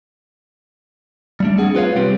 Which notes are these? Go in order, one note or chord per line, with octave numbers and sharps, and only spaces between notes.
G3 A3 D4
C4 G#4 F#5
F4 B4 C#5 F5
C3 G3 C4 G4